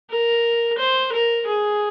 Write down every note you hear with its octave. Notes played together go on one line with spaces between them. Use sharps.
A#4
C5
A#4
G#4